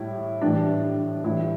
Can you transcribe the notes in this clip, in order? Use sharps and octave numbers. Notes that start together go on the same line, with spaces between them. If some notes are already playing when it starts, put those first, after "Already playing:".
Already playing: A2 G3 E4
A2 E3 G3 D4
A2 E3 G3 E4